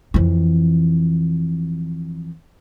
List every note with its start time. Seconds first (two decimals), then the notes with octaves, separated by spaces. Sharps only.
0.14 F2 E3